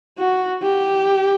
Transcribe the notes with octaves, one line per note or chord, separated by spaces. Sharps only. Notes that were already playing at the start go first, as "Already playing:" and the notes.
F#4
G4